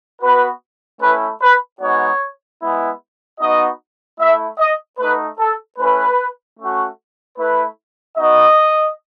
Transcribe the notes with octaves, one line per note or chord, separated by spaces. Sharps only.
B3 F#4 B4
A3 C#4 E4 B4
B4
G#3 B3 D#4 F#4 C#5
G#3 B3 E4
B3 D#4 F#4 D#5
A3 E4 E5
D#5
A3 D#4 F#4 B4
A4
A3 C#4 E4 B4
A3 C#4 F#4
A3 E4 B4
B3 D#4 F#4 D#5